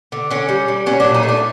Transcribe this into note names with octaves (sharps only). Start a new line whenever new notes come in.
D3
D3 C#4
G3
G3
F#3 C#4
A#2 D4
D#4
A3
D4